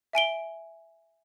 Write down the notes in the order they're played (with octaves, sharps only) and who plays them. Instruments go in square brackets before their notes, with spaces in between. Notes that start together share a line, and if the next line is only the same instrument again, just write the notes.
[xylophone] E5 G#5 D7 G7